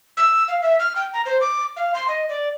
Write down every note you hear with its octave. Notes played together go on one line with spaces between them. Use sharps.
E6
F5
E5
F6
G5
A#5
C5
D6
F5
C6
D#5
D5